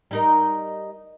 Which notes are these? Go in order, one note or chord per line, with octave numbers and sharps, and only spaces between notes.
G3 D#4 A#4